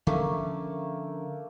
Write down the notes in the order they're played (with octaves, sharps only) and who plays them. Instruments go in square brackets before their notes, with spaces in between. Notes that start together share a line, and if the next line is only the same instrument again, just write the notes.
[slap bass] D3 F3 C#4 [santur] A3 A#3 A4